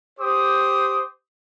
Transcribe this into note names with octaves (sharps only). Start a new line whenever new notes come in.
G4 C5 D6 D#6